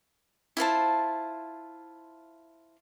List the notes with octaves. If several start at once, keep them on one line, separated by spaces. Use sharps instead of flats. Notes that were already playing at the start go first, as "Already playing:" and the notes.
E4 F4 C5 A5